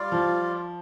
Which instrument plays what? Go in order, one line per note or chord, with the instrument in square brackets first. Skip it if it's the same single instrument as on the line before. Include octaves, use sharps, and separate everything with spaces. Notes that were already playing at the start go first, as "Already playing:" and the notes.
Already playing: [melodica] G3 F4 D5 F5
[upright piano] F3